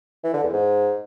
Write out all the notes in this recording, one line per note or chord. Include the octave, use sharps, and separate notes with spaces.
E3
D3
E2
G#2